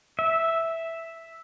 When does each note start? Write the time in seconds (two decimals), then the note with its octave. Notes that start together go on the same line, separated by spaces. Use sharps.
0.19 E5